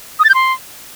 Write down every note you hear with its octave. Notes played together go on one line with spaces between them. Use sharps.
D#6
A6
G6
C6